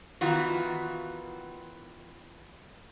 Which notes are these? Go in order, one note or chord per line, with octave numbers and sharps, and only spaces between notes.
D#3 E3 B3 F4 F#4